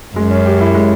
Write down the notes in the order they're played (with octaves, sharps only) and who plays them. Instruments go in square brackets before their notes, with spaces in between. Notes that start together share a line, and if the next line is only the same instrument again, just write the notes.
[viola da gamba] F#2 [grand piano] G#3
[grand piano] C#4
G4
E4
G#3